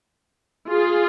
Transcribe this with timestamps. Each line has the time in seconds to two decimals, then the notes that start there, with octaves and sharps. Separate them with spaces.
0.69 F4 G#4